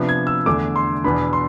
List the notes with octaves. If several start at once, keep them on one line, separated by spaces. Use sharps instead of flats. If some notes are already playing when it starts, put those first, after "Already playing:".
Already playing: C3 F3 B3 D4
G#6
E6
E2 D3 A3 D4 D6
C6
E2 B2 B3 D4 B5
C6